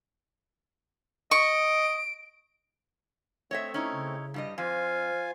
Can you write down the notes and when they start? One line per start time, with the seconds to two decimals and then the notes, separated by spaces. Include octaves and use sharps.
1.31 D#5 C#6 D7
3.51 A3 C4 C#5 D#5 E5
3.74 C#4 D#4 E4
3.92 C#3
4.34 G2 G3 D#5
4.58 F2 F4 C5 F5 G#5